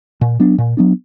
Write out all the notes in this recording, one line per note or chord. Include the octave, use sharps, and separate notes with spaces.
A#2
F#3 B3 D4
A#2
F#3 B3 D4